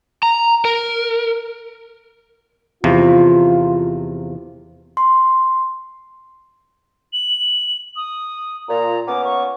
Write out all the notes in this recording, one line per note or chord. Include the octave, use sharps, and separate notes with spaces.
A#5
A#4
E2 C3 F3 F4
C6
F#7
D#6
A#2 A#5
A#3 B3 C#4 D6
C#6